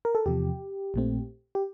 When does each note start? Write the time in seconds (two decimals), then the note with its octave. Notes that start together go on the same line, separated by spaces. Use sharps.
0.05 A#4
0.15 A4
0.26 E2 C3 F3 G4
0.94 A#1 A#2 A3 C4
1.55 G4